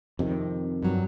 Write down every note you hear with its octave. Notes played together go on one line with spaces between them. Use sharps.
F2 C3 D#3
G2 F#3